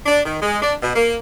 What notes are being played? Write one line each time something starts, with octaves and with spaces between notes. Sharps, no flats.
D4
D#3
G#3
D4
B2
A#3